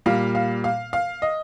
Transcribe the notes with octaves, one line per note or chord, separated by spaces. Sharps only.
A#2 G3 F5
F5
F5
F5
D#5